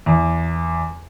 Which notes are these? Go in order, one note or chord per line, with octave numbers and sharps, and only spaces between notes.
E2